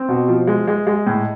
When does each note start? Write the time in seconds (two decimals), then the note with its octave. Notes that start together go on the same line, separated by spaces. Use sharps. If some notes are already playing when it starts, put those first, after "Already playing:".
Already playing: C4
0.09 B2
0.28 F3
0.47 G#3
0.68 G#3
0.87 G#3
1.07 A2